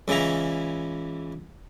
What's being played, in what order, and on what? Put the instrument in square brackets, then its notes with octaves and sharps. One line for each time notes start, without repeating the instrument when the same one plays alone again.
[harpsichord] C#2 C#3 E3 E4 A#5